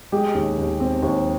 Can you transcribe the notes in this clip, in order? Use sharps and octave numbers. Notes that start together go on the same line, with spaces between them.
G#3 G4
D#2
D#2
C4
D#2